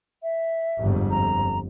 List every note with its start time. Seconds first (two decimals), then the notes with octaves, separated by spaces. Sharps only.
0.23 E5
0.78 G1 F2 G#2
1.10 A#5